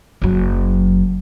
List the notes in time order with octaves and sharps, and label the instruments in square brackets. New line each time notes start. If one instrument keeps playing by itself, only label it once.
[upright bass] F#1 F#3